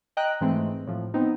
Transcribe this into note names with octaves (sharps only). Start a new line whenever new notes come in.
D#5 G5 A#5 F#6
G#2 E3 G#3 A3 C4
A2 F3
B3 C4 D#4